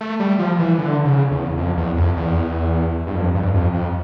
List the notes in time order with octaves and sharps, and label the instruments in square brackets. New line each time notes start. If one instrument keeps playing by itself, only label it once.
[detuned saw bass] A3
G3
F3
E3
D3
C#3
E2
F2
E2
F2
E2
G2
F2
G2
F2
F2